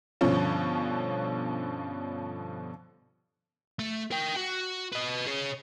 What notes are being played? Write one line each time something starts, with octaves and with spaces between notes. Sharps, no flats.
G2 B2 D3 F3 C#4
A3
A#4 G5
F#4
B4 D#5
G#4 C#5